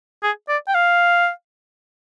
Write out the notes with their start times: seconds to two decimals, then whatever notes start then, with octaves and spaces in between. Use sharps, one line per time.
0.23 G#4
0.49 D5
0.68 G5
0.74 F5